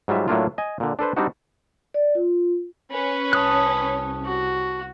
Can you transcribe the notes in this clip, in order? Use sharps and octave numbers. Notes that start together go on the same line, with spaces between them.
G#2 F#3 G3 F4 E5
A2 F#3 A3 A#3 D4 F4
D#5 G#5
A#2 D3
D4 A4 B4 C5
G3 C4 D4 D#4 F#4
D5
F4
C#4 B4
C2 A5 D#6 F#6
F#4